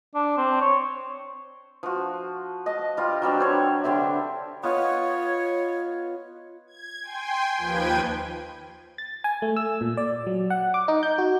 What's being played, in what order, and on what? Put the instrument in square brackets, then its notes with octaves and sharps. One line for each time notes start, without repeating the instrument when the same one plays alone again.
[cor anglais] D4
C4
C#5
[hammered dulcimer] F3 F#4
D#5 A5
G3 F4
F#3 G3 C4 D4
C5 C#5
D3 C4 G4 E5
[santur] B3 F4 D#5 [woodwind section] C#5
[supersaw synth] G#6
G5 G#5 C6
D#2 F3 B4 G5 G#6 D#7
[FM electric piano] A6
G#5
A3
E6
A#2
D5
F#3
F#5
D6
D#4
G6
F#4